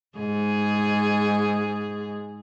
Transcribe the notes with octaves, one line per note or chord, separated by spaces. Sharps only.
G#2 G#4